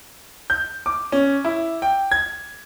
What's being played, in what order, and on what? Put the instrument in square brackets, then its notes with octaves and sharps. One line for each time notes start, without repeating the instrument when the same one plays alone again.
[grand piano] G6
D6
C#4
E4
G5
G#6